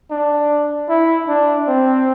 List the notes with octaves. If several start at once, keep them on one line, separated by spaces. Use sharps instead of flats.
D4
E4
D4
C4